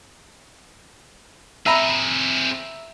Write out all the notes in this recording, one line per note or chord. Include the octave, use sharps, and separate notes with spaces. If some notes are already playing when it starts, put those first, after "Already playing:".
C4 G#4 E5 A#5 B5